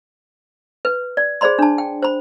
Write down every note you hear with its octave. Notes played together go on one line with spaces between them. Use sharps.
B4
D5
G#4 C5 D5 B5 C6
D4 A5
G5
C5 B5